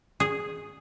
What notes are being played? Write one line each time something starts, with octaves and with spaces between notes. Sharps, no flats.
G#4